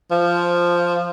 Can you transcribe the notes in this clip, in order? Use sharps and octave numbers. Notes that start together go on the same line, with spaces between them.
F3